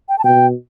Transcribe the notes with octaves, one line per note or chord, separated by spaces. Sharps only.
G5
A5
B2 G5